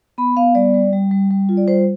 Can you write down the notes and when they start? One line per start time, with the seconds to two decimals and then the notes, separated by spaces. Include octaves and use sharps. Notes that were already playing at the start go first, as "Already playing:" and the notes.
0.18 B3 B5
0.37 B3 F5
0.55 G3 D5
0.74 G3
0.93 G3
1.11 G3
1.30 G3
1.49 F4
1.57 D5
1.68 G3 C5